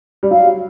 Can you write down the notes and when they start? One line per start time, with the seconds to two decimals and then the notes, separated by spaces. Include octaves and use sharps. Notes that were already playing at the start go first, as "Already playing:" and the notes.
0.23 G3
0.31 F#3 F5